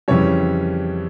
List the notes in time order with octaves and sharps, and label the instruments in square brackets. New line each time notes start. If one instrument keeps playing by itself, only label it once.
[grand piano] F2 C#3 E3 G3 C#5